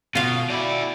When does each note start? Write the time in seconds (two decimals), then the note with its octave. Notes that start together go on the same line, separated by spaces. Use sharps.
0.15 B2 F4 F5
0.50 E4 F#4 D5